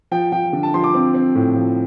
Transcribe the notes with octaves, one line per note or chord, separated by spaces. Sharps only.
F3 G5
F3 G5
D3
A5
F3 C6
D6
C4
C4
A2
F3